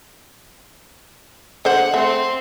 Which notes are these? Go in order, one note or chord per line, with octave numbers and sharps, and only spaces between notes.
D3 C5 F#5
A3 C4